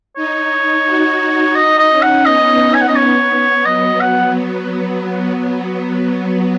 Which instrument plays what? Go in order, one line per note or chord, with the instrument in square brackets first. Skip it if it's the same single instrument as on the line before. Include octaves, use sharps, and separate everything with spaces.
[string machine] D#4 [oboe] C#5
[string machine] F#4
[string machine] D#4 [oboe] D#5
[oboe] D#5
[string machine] C#4
[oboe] F#5
[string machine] B3 [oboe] D#5
[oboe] G#5
F#5
D#5
[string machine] B3 [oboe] C#5
[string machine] F#3 [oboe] D#5
[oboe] F#5